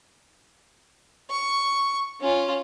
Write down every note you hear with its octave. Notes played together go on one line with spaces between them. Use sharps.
C#6
C#4 F4